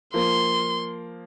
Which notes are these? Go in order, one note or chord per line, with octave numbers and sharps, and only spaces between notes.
F3 A#3 C6